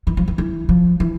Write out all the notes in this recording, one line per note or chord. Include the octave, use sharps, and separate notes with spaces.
E3
F3
E3
E3
F3
E3